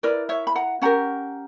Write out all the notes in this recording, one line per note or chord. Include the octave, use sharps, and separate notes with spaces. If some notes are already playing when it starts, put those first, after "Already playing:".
E4 A#4 B4 D5
C#5 E5
B5
F#5 A#5
C#4 G4 A#4 F#5 A#5